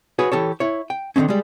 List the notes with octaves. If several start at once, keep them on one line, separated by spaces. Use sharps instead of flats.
F#4 G#4 B4 C#5
E3 G4 A4 C#5
E4 C#5
G5
D3 D#3 F3 C4 C#4
G3 G#3